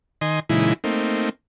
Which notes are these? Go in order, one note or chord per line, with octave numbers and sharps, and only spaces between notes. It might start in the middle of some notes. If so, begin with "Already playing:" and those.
D#3 D#5 G#5 C6
A#2 C#3 E3 G#3 D#4 E4
A3 A#3 C4 D#4